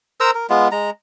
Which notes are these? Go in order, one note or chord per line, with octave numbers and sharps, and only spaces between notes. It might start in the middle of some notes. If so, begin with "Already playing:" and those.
A#4 C5 A#5 E6
A#4
G#3 B3 F4
G#3 A#5